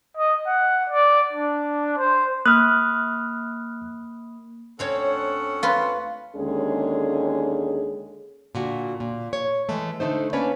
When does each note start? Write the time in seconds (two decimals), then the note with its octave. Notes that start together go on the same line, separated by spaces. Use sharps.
0.17 D#5
0.47 F#5
0.89 D5
1.33 D4
1.98 C5
2.46 A#3 B5 D#6 F6 F#6
4.79 D2 C4 C#4 A4 C#5 F#5
5.63 F4 B4
6.36 D#2 D3 G#3 C#4 G#4
8.55 A#2 D3 F#4
9.00 A#2
9.33 C#5
9.69 E3 G#3 A3
10.00 D3 A3 D#4 C5
10.33 A#3 C#4 D4 B4 C#5 D5